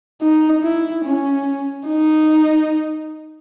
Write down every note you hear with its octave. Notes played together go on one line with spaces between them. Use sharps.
D#4
E4
C#4
D#4